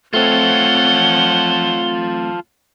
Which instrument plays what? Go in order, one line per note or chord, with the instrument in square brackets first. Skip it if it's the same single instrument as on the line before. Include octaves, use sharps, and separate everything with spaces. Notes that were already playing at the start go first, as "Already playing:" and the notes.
[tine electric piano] A3 C4 [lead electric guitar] F4 A4 [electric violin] C#5 F#5 [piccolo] G7